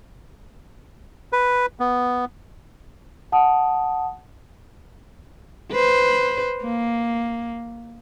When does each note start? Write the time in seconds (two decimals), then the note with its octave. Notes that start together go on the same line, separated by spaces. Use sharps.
1.33 B4
1.80 B3
3.32 F#5 A5 D#6
5.72 B4 C5
6.62 A#3